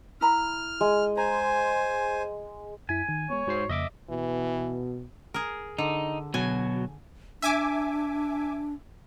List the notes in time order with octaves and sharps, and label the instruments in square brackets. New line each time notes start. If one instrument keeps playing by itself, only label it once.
[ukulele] E4 A#5 B5 [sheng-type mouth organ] F6
[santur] G#3
[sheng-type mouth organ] C5 G#5 [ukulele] A#5
[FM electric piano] F#2 E4 B6 [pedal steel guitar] G#5
[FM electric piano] D#3
[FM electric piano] G#3 B3 [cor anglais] C#5
[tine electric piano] G#2 C5 C7 [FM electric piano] F#4
[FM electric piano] F2 C#3 A#3 [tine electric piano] D#5 E5 D6
[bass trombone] B2 [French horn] E3
[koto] G#4 A#4
[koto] D3 [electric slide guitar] D#4
[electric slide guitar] B2 F#3 [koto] G#5
[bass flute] D4 [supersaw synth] E5 G#5 D6